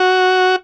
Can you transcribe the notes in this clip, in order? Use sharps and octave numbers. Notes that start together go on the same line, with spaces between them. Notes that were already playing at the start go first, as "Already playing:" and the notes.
Already playing: F#4